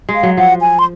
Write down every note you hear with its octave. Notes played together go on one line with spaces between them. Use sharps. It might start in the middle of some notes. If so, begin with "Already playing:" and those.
G#3
F5
F#3
F3 F#5
G#5
C6